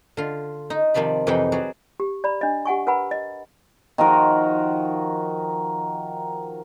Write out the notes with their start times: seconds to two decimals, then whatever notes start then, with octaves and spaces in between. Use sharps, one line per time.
0.17 D3 F4
0.70 D#4
0.94 C3 D#3 F3 D5 B5
1.27 F2 C3 E3 D#4 F#5 G5
1.52 F#3 F#4 G#4 D5
2.00 G4
2.24 D5 A#5 B5
2.41 D4 D#5
2.66 G4 F#5 G#5 C#6
2.87 A#4 B4 F#5 G#5 A#5 B5
3.11 D#5
3.98 D#3 F3 F#4 A#4